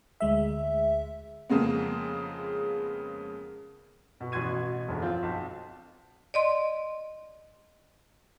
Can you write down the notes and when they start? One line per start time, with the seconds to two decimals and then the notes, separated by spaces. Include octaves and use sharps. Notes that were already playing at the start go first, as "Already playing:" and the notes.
0.20 D2 G#3 E5
1.50 F2 C#3 G#3 A#3 B3
4.20 B2
4.32 A1 B2 F#4 C6 G#6 D#7
4.88 E1 A#1 D3
5.02 F3 C4 F4
5.23 B1
6.34 D5 D#5 C6